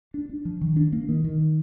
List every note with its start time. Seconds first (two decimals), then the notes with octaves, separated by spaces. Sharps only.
0.14 D4
0.29 D4
0.45 F3
0.61 D#3
0.76 D4
0.92 A#3
1.09 D#3
1.24 D#3